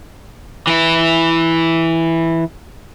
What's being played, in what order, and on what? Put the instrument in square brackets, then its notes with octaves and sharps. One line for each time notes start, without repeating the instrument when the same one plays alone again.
[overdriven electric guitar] E3 E4